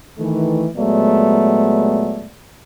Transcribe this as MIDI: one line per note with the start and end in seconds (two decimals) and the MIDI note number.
0.18 0.66 51
0.18 0.66 52
0.18 0.66 57
0.76 2.29 46
0.76 2.29 54
0.76 2.29 56
0.76 2.29 57
0.76 2.29 59
0.76 2.29 74